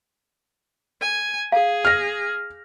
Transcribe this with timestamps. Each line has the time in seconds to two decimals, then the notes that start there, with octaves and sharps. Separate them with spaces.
1.01 G#5
1.52 G#4 F5
1.85 F6 A#6